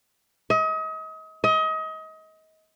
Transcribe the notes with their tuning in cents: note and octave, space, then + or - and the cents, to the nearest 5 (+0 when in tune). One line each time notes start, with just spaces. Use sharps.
D#5 +35
D#5 +30